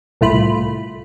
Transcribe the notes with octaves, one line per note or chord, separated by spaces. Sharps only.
C2 A2 A3 F4 B5